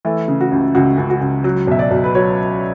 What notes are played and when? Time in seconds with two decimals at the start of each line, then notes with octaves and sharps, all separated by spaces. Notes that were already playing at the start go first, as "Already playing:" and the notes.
0.05 E3 A3
0.28 C#3
0.41 F#4
0.52 C#2
0.75 C#2 F#4
0.98 C#2
1.10 F#4
1.21 C#2
1.44 F#3
1.67 B1 E5
1.79 D5
1.91 B1
2.04 B4
2.15 F#3 C#5